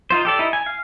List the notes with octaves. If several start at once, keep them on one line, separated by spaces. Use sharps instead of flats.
D#4 F4 C5
G4 A4 D5
D#4 E4
G#5
F5